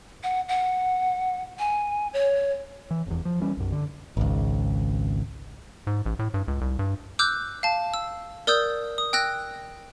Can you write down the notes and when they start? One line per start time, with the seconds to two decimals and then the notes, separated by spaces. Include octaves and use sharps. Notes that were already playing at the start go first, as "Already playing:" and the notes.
0.23 F#5
0.49 F#5
1.59 G#5
2.14 C#5
2.91 E3
3.07 F1 E2
3.25 F3
3.41 E3 G3 C#4
3.57 B1 F#2
3.72 D3
4.17 G#1 C#2
5.87 G#2
6.06 A1
6.19 A2
6.34 G2
6.48 C#2
6.61 C2
6.79 G2
7.19 D6 E6 F#6 G6
7.63 F5 A5
7.94 E6
8.47 A#4 D5 D#6 E6 G6
8.98 D#6
9.13 G5 E6 F#6 A#6